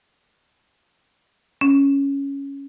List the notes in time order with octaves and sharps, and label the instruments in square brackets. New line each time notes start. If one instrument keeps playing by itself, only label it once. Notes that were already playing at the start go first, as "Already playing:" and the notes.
[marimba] C#4